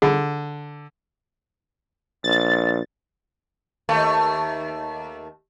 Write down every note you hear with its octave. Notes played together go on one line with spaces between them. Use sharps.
D3 G#4 B5
A#1 A6
D#2 A3